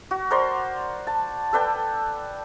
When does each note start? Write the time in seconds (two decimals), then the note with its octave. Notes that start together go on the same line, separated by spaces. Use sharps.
0.11 F#4
0.31 A#4 C5 D5 C6
1.07 A5
1.53 A4 B4 D5 G5